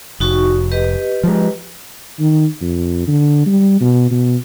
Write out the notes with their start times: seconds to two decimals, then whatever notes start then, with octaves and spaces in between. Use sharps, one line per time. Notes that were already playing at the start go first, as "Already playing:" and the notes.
0.20 F1 D#4 F#4 C#6
0.72 G4 B4 D#5
1.24 F3 G#3
2.20 D#3
2.61 F2
3.08 D3
3.46 G3
3.81 B2
4.11 B2